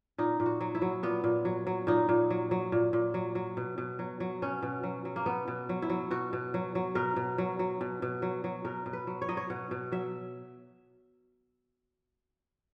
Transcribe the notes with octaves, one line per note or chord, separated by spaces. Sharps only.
A#2 D#4
A#2
F#4
F#3
E4
F#3
A#2 B3
A#2
F#3
F#3
A#2 D#4
A#2
F#3
F#3
A#2
A#2
F#3
F#3
B2
B2
F#3
F#3
B2 C#4
B2
F#3
F#3
A#3
B2 B3
B2
F#3
E4
F#3
B2 F#4
B2
F#3
F#3
B2 A#4
B2
F#3
F#3
B2
B2
F#3
F#3
B2 A#4
B2
B4
F#3
C#5
F#3 D#5
C#5
B2 F#5
B2
F#3 E5